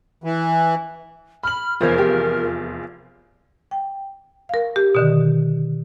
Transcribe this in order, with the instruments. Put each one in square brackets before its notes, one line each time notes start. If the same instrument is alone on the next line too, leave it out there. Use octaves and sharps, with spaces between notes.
[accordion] E3
[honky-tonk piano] B5 F#7 [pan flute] F6
[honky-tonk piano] F1 E2 F4 [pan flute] A#4 [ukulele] C5 C#5
[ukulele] G4
[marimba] G5
A#4 F5
G4
B2 D3 D#3